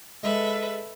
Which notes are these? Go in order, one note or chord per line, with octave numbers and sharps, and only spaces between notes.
G#3 A4 B4 E5